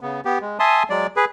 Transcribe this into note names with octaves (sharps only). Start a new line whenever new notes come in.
C#3 B3
B3 G4
G#3
E5 G#5 A5 C6 D#6
F#3 G#3 D5
G#4 B4